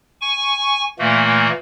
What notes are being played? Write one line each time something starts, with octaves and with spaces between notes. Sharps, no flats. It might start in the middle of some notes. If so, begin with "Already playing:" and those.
G#5 C#6
A#2 E3 A3 A#3